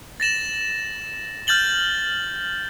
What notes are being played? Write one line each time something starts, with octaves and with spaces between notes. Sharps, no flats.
A6 A#6 E7 F#7
F6 G6 A6 F#7 G7